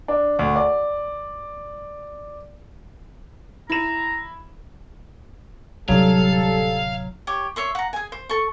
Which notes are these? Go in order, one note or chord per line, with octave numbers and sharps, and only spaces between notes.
D4
D2
D5
E4 A#5 E7
D1 C3 F#3 G3 D4 A4 F5
G4 C#5
C#5 E5 C6
F#5 A#5
G#4 G#5
C5
A4 C#6